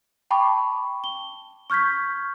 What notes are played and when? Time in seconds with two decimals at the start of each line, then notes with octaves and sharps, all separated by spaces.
0.31 G5 A5 B5 C#6 D6
1.04 G7
1.70 C#6 F6 G6 G#6 B6